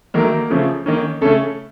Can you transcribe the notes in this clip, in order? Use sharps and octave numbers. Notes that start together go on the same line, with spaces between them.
D#3 F#3 A3 A#3 A#4
C#3 F3 A3 C#4
D#3 A#3 C#4
C#3 A3 C#4 A4